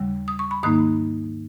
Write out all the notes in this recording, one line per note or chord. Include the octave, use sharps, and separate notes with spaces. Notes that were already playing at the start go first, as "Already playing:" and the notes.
Already playing: D#2 C#3 G3
D#6
C#6
B5
G#2 D#3 A#3 D#4 D#6